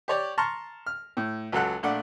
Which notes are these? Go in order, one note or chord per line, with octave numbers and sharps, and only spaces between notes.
G4 C#5 D5
A5 A#5 C6 C#6 F6
F6
A2
C#2 F#3 A4 F#5 F#6
A#1 A3 D4 F#5